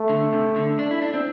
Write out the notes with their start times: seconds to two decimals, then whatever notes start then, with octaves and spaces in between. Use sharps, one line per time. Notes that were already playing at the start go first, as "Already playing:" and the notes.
Already playing: A3
0.09 D3
0.33 C3
0.56 D3
0.79 D4
0.91 E4
1.02 D4
1.14 C4